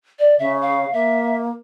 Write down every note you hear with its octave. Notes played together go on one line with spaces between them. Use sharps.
D5
C#3 E5
F5
A#3 E5